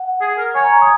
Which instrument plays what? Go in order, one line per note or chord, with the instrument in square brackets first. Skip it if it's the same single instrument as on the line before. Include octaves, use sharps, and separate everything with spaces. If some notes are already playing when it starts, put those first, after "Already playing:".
Already playing: [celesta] F#5
[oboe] G#4
A#4
[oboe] C#5 [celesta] G#5
[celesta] A#5
D#6